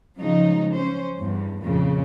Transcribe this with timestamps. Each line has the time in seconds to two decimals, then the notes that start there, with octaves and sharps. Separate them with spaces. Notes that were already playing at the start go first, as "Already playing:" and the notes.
0.19 C#3 F3 F#3 G#3 D#4
0.72 C#4 C5
1.19 E2 G2
1.62 F2 A#2 C#3